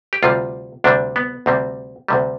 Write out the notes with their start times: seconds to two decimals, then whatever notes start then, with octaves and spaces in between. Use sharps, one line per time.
0.13 G4
0.23 D2 C3 G3 F4
0.84 D2 C3 G3 D4
1.16 B3
1.46 D2 C3 G3 C4
2.08 D2 C3 G3